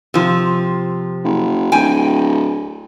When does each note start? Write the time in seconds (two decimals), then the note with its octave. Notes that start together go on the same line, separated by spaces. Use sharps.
0.14 C3 F3
1.24 F#1
1.72 D1 G5 G#5